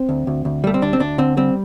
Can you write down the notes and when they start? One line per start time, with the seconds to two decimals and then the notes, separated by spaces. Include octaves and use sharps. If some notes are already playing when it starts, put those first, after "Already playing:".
Already playing: C4
0.09 D2
0.27 D2
0.45 D2
0.64 G3 A3
0.74 C4
0.82 D2 D4
0.93 C4
1.00 D2 D4
1.18 D3 C4
1.37 G3 C4